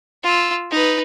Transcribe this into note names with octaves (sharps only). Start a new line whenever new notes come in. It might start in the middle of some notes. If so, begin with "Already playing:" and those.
F4 E6
D#4 B4